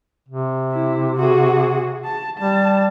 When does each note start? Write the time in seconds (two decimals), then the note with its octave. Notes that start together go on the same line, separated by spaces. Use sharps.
0.29 C3
0.72 E4
1.17 F#4 G#4
2.05 A5
2.38 G3 A5